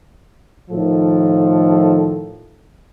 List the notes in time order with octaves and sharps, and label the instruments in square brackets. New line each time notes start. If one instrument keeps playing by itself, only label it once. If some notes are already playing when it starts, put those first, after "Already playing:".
[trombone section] A2 D#3 F3 A4